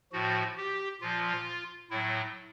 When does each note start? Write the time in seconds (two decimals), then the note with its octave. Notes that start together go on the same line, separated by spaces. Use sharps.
0.12 A2 F3 F#4
0.57 G4
1.01 A#2 F3 F4
1.90 A2 F#3 E4